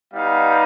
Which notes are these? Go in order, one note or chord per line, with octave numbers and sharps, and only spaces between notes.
G3 B3 D#4 F5